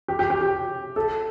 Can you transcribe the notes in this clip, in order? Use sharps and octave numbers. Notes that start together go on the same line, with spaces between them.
G4
G4
G4
G4
A4